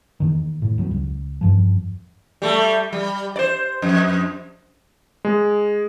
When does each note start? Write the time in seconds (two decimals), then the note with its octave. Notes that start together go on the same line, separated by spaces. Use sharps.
0.20 E2 D#3
0.62 A2
0.78 D#2 F#3 G3
0.91 C#2
1.41 E2 G2 F3
2.42 G3 A3
2.92 G3
3.36 C5 D5
3.82 F2
5.25 G#3